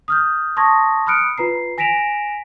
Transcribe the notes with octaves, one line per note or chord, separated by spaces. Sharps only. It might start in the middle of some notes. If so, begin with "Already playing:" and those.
D#6 F6 G6
A5 C6 C#6 D#6 G#6 A#6
B5 D#6 F6 F#6 C#7 D7
F4 B4 A#5 C7
G#5 A#6 B6 D7 E7 F7